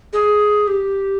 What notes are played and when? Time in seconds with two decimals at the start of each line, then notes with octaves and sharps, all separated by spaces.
0.13 G#4
0.67 G4